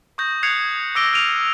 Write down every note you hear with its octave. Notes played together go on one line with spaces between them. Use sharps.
C#6 D#6 G6 A#6
D#6 F#6 G#6 C7 C#7 F7
D6 E6 A#6 D7 G7
F6 D7 D#7 F7